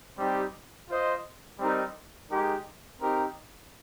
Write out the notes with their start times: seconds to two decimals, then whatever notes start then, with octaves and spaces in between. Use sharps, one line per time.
0.18 G3 C4 D#4 G4
0.89 F4 C5 D#5
1.59 G3 C4 D#4 A#4
2.29 G#3 D#4 G4 A#4
3.01 C4 D#4 G4 A#4